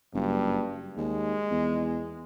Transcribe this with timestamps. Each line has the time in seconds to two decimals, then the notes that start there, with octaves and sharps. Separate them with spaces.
0.14 F#1 G2
0.97 D#2 G#3
1.51 E2